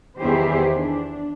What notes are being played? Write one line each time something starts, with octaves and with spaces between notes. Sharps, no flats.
E2 D#3 E4 G4 G#4 C5
D4